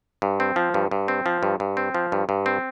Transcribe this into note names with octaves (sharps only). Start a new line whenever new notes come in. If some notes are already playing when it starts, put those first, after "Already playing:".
G2
C4
F3
G2
G2
C4
F3
G2
G2
C4
F3
G2
G2
C4